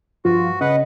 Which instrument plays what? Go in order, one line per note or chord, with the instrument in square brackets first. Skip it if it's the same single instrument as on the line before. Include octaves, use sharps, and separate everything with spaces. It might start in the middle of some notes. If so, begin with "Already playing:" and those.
[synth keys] G2 [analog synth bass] F3 [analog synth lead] F4 [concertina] F#4
[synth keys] C#3 [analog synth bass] C#4 [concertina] B4 F#5 [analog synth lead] D#5